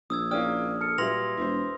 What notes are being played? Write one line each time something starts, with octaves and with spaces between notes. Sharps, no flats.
A#1 D#6 E6 G#6
A#3 C#4 E4 G#4 D5 G5 D#6 F6
A4 F6 C#7
A#2 F#3 G3 B4 E5 C6 A#6 F7
E1 E4 C5